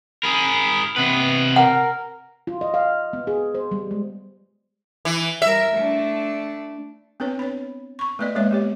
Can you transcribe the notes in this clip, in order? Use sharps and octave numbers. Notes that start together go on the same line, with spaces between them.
G#4 A#4 B5
C3 B3 B4
A#4 F#5
F4
D#5
F5
B3
G#4
C5
G3
G#3
E3
G3 A#4 E5
A3 D4
B3 C4 D4 B4 C#5
C#5 B5
B5 C#6
A3 B3 B4 D5 D#5
G#3 A#3 B3 C#5 E5
B3 G4 C#5